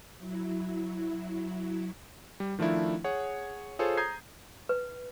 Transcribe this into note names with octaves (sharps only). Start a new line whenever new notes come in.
F#3 E4
G3
D#3 F3 A3 D4 E4
G#4 C#5 F#5
F4 G#4 A4 C5 C#5
A#5 D#6 G6 G#6 C7
B4